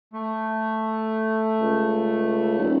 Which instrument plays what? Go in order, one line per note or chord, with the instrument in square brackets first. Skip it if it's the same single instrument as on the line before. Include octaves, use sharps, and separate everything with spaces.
[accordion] A3
[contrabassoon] C#2
D#1